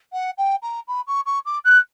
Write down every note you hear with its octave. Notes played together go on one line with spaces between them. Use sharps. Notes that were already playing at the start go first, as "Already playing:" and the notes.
F#5
G5
A#5
B5
C#6
C#6
D6
F#6